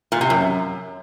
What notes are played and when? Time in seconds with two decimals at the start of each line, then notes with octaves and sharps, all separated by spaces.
0.12 A#2
0.21 C3
0.30 F#2